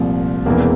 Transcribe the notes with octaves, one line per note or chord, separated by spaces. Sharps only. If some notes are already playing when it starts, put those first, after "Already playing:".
Already playing: C2 A#2 F3 A3
E1 E2 C3 E3 A#3